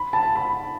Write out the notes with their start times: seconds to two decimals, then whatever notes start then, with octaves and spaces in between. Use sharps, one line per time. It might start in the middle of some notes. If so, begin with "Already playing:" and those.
Already playing: B5
0.13 A5
0.35 B5